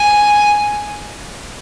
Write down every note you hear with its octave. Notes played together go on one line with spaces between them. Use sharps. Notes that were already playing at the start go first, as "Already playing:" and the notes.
Already playing: G#5